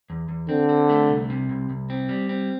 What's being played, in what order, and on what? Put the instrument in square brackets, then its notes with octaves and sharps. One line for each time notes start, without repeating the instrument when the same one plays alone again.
[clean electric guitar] E2
E2
[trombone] D3 [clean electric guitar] C4
[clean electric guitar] C4
A3
C2
C3
C2
C2
C4
G3
C4